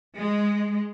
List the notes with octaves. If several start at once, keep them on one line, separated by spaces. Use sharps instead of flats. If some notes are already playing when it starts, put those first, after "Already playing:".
G#3